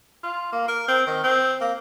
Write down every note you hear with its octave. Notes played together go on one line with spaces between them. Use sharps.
F4
A#3
A#4
C4
D#3
C4
A#3